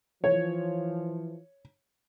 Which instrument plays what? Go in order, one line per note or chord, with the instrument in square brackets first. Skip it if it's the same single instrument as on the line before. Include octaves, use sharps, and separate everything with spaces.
[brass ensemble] E3 F3 [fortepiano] C#5